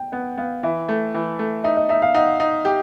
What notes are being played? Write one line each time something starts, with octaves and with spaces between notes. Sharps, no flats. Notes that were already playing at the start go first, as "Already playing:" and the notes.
Already playing: G5
B3 F#5
B3 F5
E3 E5
A3
E3
A3
D#4 E5
D#5
D#4 E5
F5
D#4 F#5
D#4
G4